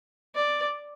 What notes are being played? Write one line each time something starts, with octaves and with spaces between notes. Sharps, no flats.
D5